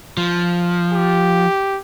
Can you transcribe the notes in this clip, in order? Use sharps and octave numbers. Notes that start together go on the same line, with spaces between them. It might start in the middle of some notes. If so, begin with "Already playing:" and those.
F3
G4